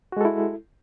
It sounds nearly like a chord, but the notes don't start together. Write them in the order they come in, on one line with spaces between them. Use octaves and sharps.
F#4 G#3 A4 E4